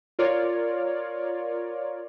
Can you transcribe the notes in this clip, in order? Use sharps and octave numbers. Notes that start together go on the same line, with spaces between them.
F4 A#4 C#5 D5